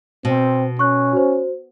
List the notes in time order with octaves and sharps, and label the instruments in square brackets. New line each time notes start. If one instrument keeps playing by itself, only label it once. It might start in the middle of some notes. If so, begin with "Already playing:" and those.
[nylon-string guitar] B2 [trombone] C4
[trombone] C#4 [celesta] C#6 F#6
[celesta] F#4 C5